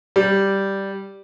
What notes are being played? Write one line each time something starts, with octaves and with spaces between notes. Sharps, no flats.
G3